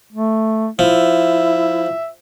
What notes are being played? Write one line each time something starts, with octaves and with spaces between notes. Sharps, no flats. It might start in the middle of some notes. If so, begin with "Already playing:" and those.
A3
F3 E4 E5